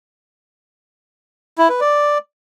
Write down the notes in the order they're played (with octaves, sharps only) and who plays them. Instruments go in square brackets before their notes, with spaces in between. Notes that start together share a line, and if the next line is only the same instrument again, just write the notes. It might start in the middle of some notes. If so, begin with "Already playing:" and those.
[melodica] E4
B4
D5